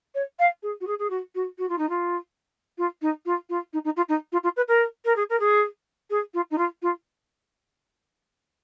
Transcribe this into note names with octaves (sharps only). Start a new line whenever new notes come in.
C#5
F5
G#4
F#4
G#4
G#4
F#4
F#4
F#4
F4
D#4
F4
F4
D#4
F4
F4
D#4
D#4
F4
D#4
F4
F4
B4
A#4
A#4
G#4
A#4
G#4
G#4
F4
D#4
F4
F4